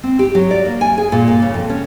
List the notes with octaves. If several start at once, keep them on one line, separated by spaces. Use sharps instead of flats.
C4
G4
F#3
D5
A#3
G#5
G#4
A#2
A#3
C#3
F2
C#4